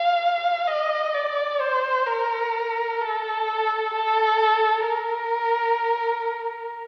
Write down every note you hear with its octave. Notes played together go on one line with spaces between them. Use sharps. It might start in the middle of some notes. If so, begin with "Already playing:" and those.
Already playing: F5
D#5
D5
C5
A#4
A4
A4
A#4